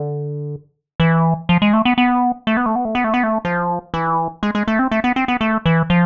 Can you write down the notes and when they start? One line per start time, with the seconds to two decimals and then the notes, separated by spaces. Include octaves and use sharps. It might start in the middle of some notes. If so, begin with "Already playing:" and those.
Already playing: D3
1.00 E3
1.49 F3
1.62 G#3
1.73 A3
1.85 B3
1.98 B3
2.47 A3
2.57 B3
2.66 A3
2.76 B3
2.85 A3
2.95 B3
3.04 A3
3.14 B3
3.23 A3
3.45 F3
3.94 E3
4.43 G#3
4.55 G#3
4.68 A3
4.79 C4
4.92 A3
5.04 B3
5.16 C4
5.28 B3
5.41 A3
5.66 E3
5.90 F3